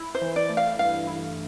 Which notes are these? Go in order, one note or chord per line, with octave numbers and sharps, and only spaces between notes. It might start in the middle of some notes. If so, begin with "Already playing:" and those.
Already playing: E4
C5
E3
D5
A3
F5
G2 F5
E4